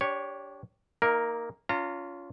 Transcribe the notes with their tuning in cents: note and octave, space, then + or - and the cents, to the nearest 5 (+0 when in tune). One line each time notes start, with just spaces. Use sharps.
D4 -25 G4 +0 C#5 +0
A#3 +0 D#4 +25 A#4 +0
C#4 +30 F4 +0 A#5 -35